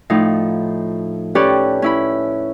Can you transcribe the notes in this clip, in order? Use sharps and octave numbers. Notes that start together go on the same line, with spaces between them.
A2 F3 D#4
C#4 G4 A4 B4 C#5 D5
C#4 E4 B5